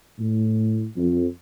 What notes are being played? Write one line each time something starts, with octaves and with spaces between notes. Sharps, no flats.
A2
F2